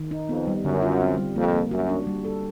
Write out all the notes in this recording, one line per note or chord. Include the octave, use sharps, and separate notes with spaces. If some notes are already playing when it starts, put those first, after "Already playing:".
Already playing: D#3
D#4
F2 B3
G3
F#2 D3
F4
C4
G3
F2 A#3
A#3
F#2 F#4
D4
G3
A4